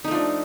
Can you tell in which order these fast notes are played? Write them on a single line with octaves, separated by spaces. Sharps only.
D#4 A3 F3 D4